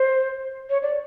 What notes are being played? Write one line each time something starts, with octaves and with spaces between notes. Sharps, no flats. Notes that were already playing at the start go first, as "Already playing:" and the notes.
Already playing: C5
C#5
D5